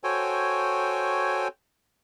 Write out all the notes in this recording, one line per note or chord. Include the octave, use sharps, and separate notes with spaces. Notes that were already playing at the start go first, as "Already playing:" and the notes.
F#4 A4 C5 C#5 G5 G#5